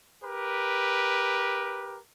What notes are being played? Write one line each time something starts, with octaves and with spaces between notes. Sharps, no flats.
G4 A#4 B4